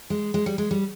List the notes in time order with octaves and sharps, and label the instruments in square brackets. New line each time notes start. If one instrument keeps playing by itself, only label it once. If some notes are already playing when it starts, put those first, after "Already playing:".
[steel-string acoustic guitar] G#3
G#3
G3
G#3
G3